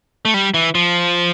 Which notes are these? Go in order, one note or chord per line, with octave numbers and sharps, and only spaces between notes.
A3
G3
E3
F3